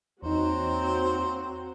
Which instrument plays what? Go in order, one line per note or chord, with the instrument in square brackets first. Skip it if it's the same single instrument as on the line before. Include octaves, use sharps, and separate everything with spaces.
[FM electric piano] E2 D#4 [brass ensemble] A#3 C#5 A#5 [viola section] C4 F#4 [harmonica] C5